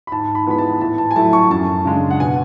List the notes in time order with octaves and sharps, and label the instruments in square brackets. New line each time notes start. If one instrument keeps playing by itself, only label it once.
[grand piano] B5
G#2 A5
B5
E3 G#3 B3 B5
A5
A2 A5
A5
G#5
F#3 A3 E4 A5
C#6
F#2 A5
C#3 G#3 D4
F#5
B2 G#5